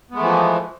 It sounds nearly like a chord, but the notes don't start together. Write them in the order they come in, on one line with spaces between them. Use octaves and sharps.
B3 G#3 A3 E3 F3